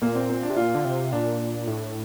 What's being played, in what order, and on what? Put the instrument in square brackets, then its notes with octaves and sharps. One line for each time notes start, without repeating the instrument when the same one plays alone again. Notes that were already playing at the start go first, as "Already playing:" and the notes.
[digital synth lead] A#2 [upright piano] A#3
[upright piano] C4
C4
D4
[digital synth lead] C3
[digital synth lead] A#2 [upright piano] F4
[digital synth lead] D3
C3
[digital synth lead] A#2 [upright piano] D4
[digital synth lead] A2